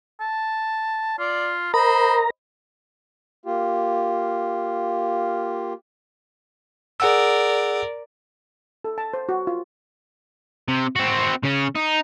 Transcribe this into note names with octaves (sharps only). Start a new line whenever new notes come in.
A5
F4 D5
A#4 C5 D#5 A#5 B5
A#3 F4 G4
G#4 A#4 D5 F#5 E6
A4
A5
C5
F#4
F4
C3
C4 F#4
C#3 C#4
D#4